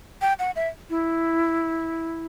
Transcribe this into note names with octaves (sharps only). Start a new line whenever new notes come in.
G5
F#5
E5
E4